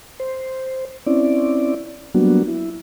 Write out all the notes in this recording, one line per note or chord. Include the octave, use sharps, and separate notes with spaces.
C5
C4 C#4 E4 D5
F#3 G3 A#3 B3 D4 F#4
E4